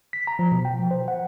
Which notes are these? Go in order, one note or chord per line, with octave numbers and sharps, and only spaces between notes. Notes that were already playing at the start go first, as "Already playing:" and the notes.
B6
A#5
F3
B2
G5
F3
C5
F#5